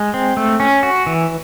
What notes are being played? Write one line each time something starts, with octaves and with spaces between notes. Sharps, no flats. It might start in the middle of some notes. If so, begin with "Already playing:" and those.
Already playing: G#3
C4
A3
C#4
F#4
E3